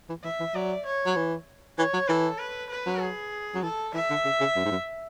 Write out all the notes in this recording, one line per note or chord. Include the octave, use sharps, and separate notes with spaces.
E3
E3 E5
E3
F#3 D5
C#5
F#3
E3
E3 C#5
F#3
E3 A4
B4
B4
F#3
G#4
F#3
E3 A4
E3 E5
D3
C#3
C#3
F#2
G#2
F#2